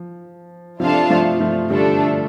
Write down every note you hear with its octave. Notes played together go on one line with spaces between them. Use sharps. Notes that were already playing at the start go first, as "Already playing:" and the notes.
Already playing: F3
C3 F3 D4 F4 A4 F5 A5
F3 A3
F3 A3
D3 G3 A3 D4 A4